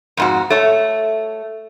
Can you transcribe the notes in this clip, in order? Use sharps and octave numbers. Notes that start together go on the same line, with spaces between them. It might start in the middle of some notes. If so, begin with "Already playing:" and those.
F2 G#2 F#4
A3 C#5